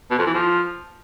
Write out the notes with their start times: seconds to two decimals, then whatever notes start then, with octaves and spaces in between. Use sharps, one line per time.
0.10 B2
0.18 F2
0.26 E3
0.34 F3